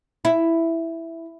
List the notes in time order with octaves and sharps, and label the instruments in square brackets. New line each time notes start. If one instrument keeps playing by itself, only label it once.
[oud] E4